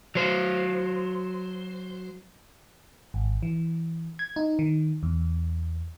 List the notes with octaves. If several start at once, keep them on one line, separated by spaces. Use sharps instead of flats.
F#3 C5
G#1
E3
G#6
D#4
D#3
E2